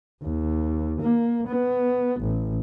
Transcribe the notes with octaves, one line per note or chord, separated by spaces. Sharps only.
D#2
A#3
B3
A1